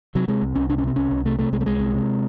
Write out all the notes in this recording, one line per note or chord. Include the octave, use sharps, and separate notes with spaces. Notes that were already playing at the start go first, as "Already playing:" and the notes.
C3 F#3
C3 G#3
C2
C2 C#4
C3 D4
C#4
C3 C4
C2 C#4
C2
C3 A3
C3 A3
C2 G#3
A3
C2 G#3
C3
C3